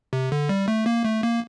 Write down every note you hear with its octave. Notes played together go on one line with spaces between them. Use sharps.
C3
D3
G3
A3
A#3
A3
A#3